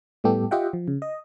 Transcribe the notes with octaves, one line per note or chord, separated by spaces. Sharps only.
A2 G3 A3 B3 G4 A4
F4 G4 D#5 E5 F#5 G5
F3
C#3
D#5